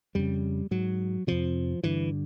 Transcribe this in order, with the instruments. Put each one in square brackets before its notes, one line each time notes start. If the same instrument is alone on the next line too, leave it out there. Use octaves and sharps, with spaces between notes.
[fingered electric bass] F2 C#3 G3
G#2 F#3
F2 C3 F3
G2 D3 E3